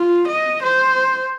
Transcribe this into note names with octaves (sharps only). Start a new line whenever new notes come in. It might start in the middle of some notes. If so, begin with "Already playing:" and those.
Already playing: F4
D#5
C5